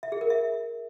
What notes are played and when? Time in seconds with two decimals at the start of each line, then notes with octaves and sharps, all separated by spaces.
0.03 E5
0.12 G#4
0.21 A#4
0.30 E5